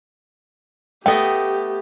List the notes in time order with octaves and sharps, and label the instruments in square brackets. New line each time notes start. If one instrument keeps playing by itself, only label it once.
[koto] A3 B3 D#5 [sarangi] G4 [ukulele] G5